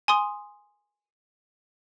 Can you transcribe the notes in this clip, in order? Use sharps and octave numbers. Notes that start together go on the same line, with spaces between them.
G#5 C6 D#6